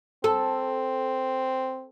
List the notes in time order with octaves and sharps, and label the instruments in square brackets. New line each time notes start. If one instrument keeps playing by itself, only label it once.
[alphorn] C4 [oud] A4